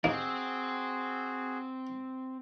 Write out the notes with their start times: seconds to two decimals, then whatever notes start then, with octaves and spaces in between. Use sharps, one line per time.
0.04 D#2 A#3 C4 F#4 G#4